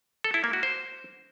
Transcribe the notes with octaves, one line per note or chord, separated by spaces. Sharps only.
A4
E4
A#3
F#4
C5